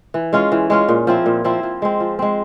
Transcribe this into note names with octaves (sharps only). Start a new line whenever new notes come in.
E3
G#3 C#4 F4
E3
G#3 C#4 F4
A#2
F3 C4 E4
A#2
F3 C4 E4
F3
G#3 C4
F3
G#3 C4